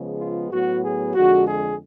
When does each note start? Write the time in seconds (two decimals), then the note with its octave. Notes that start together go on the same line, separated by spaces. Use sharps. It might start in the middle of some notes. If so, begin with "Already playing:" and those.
Already playing: C#3 F3 G#3 B3
0.19 F4
0.51 A2 F#3 B3 F#4
0.83 G#4
1.15 F2 D3 G#3 F#4
1.47 G#4